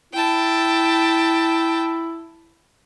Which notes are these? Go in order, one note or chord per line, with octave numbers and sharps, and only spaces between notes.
E4 G5 A5